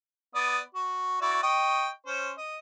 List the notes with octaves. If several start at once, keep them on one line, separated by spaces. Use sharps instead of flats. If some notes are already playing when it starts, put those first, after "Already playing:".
B3 D5 D#6
F#4
E4 F#4 D5
D#5 G5 C#6
C#4 C5
D#5